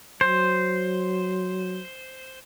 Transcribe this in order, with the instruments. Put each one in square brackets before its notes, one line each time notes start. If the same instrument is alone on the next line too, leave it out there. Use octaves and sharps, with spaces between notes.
[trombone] F#3 [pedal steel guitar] C5